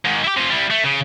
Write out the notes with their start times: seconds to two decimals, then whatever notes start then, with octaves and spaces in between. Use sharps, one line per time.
0.05 G#2 D#3
0.24 E4 G4
0.37 C3 F4
0.50 G3 E4
0.70 A3
0.84 C#3